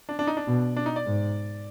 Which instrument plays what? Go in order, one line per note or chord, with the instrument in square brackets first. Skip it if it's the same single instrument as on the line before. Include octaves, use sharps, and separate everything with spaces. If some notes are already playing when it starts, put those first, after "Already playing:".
[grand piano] D4
D4
D#4
D4
[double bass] B2
[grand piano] D4
D#4
D5
[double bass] G#2